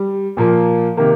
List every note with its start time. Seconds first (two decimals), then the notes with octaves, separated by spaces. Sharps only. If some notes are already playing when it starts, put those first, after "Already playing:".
Already playing: G3
0.37 A#2 F3 A#3
0.97 C3 D#3 A#3